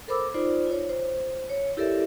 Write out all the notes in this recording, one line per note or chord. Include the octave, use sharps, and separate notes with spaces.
A4 A#4 C5 B5 D6 E6
D#4 F4 C5 D5
F4 C#5
C5
C#5
E4 G4 A4 A#4 D5 E5